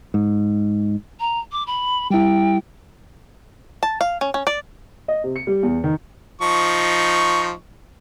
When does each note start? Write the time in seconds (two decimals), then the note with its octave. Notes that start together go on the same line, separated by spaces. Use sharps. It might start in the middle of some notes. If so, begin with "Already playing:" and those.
0.14 G#2
1.20 A#5
1.52 D6
1.67 B5
2.11 G3 E4 G5
3.83 A5
4.01 F5
4.21 C#4
4.34 C#4
4.47 D5
5.08 D#5
5.24 C3
5.36 C#7
5.47 G3
5.63 E2
5.84 D#3
6.41 F3 D#4 C#6